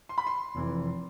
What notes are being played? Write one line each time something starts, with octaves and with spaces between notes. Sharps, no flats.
C6
B5
C6
F1 F2 E3